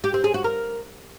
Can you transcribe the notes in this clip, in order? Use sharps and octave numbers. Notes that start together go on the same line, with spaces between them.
G4
C4
G#4
F#4
A#4